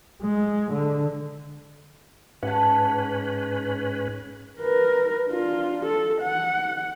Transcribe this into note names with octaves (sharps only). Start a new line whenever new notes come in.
G#3
D3
G#2 C#4 B4 F#5 A5
A#4 B4
D4 F4
A4
F#5